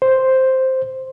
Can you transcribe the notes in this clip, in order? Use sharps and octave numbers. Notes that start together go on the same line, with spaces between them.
C5